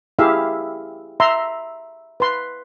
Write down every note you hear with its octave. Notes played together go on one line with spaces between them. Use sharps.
E4 G4 G#4 E5 F5
E5 A#5 C6
B4 C6